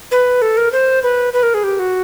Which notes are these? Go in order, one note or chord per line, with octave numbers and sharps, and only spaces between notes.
B4
A4
A#4
C5
B4
B4
A#4
G#4
G4
F#4